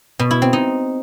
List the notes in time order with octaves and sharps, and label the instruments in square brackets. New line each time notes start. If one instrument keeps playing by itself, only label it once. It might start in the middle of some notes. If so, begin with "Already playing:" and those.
[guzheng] B2
E4
C4
D#4